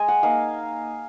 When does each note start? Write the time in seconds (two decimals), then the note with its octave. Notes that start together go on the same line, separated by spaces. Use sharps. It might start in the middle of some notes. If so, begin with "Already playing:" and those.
Already playing: G#3 D#5 G#5
0.08 F#5
0.23 A#3 D#4 F5